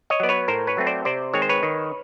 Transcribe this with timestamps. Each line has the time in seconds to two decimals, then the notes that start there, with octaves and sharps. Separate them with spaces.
0.10 C#5 D#5
0.20 F#3 B3 D5
0.29 B4 C#5
0.48 A2 A#4 C5
0.67 B4 C#5
0.77 F#3 A3 C4
0.86 C5 D5
1.05 C3 C5 D5
1.34 D#3 G#3 C4 C#5
1.42 C5
1.49 B4 C#5
1.63 D#3